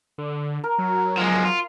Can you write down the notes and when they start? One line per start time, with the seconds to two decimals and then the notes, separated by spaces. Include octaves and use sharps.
0.18 D3
0.64 A#4
0.78 F#3
1.17 F3 G#3
1.45 F4